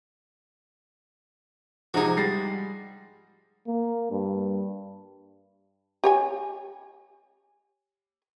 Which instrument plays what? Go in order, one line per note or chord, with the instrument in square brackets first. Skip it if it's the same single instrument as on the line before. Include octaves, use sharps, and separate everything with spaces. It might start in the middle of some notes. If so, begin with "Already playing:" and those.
[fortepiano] G#2 D#4 [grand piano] C3 F3 [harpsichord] F#4 G#4
[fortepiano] G3 G#3 [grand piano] A6 A#6 C7
[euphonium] A#3
G2
[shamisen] G4 C#5 G#5